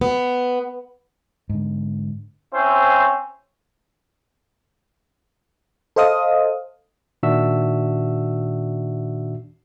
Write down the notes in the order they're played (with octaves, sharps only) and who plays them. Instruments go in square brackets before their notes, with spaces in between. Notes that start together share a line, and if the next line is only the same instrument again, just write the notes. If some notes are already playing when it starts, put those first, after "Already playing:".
[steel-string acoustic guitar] B3
[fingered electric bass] G#2 D3
[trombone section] C4 C#4 E4 C5
[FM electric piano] A4 C5 D#5 F5 D#6
[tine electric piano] A#2 D#3 D4 F#4 E5 E6